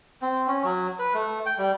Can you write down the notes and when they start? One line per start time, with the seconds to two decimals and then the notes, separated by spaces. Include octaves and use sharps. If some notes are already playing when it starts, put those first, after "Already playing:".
0.22 C4
0.48 C#4
0.64 F#3
0.99 B4
1.14 A3
1.46 G5
1.58 G3